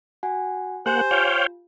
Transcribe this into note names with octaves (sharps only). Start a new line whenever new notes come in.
F#4 F#5 G#5
A#3 G4 C5 F#5 G#5
F4 C#5 F5 G5